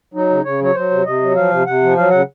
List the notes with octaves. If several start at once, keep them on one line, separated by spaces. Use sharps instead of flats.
F#3 D#4
C#3
C#3 C#5
F#3 C#5
F#3 C5
C3
C3 D#5
F#3
F3 F5
C3
C3 F#5
F3
F#3 F5
C#3 F#5